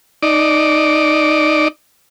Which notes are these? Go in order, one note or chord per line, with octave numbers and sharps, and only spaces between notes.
D#4 D5